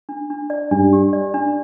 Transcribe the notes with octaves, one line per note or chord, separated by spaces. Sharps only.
D4
D4
D5
G2 D4
G4
D5
D4